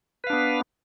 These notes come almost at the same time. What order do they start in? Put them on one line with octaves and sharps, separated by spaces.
B4 F5 D4 B3